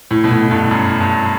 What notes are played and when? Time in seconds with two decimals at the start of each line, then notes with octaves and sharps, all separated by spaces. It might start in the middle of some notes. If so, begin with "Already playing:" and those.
0.11 A2
0.24 B2
0.31 A2
0.51 G2
0.71 F#2
1.00 G2